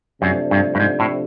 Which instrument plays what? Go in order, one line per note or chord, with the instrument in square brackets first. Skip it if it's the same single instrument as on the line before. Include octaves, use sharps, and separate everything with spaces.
[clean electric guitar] F#2 [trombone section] C3 F3 A3 D4
[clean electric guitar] G2
G2
G#2
A2